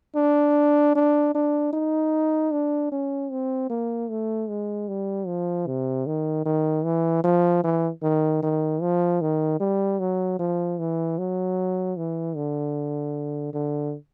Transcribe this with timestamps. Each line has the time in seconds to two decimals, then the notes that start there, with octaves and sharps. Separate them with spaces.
0.16 D4
0.95 D4
1.35 D4
1.73 D#4
2.52 D4
2.92 C#4
3.31 C4
3.70 A#3
4.10 A3
4.49 G#3
4.88 G3
5.27 F3
5.67 C3
6.07 D#3
6.45 D#3
6.85 E3
7.24 F3
7.64 E3
8.03 D#3
8.43 D#3
8.81 F3
9.21 D#3
9.60 G3
10.00 F#3
10.39 F3
10.79 E3
11.19 F#3
11.97 E3
12.36 D3
13.54 D3